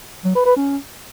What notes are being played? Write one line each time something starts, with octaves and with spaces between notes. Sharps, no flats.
F#3
B4
B4
C#4